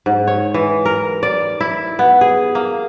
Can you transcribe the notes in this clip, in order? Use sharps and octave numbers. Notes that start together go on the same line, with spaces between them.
G#2
C#5
E3
A#4
D5
E4
B3
G#4
A#3